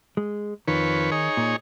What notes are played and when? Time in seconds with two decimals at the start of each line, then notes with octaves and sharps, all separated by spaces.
0.17 G#3
0.68 F2 D#3 B4 C#5
1.12 D#4 G#4 C#5
1.37 A#2